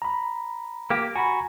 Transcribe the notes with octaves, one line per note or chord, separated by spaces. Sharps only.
A#5 B5
A#3 G4
F#4 G#5 A#5 B5